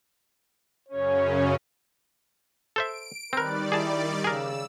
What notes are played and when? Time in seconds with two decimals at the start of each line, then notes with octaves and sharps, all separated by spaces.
0.88 F#2 C#3 C#4 C#5
2.76 A4 C5 E5 D7
3.33 D#3 G3 C4 A#4 B4 D5
3.72 E4 G#4 A5
4.24 C#3 G#4 A#4 E6